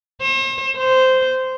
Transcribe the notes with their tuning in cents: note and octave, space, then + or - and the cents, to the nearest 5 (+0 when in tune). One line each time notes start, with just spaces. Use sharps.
C5 +40
C5 -10